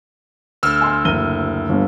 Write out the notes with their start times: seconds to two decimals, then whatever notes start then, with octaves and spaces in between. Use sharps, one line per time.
0.63 D2 E6 F6
0.81 G#5 C6
1.05 F#1 D#7 G7
1.69 G1